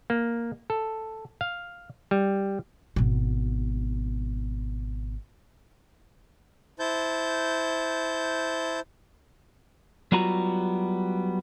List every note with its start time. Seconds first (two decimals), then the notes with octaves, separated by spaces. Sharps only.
0.10 A#3
0.70 A4
1.41 F5
2.11 G3
2.96 G#1 B2
6.79 E4 C5 A5 G6
10.12 F#3 G3 B3 F4 F#4 A#5